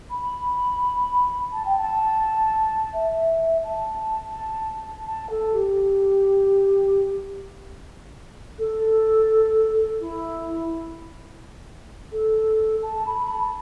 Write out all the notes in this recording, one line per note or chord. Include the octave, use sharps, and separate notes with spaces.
B5
A5
G5
A5
E5
A5
A5
A4
G4
A4
E4
A4
A5
B5
A5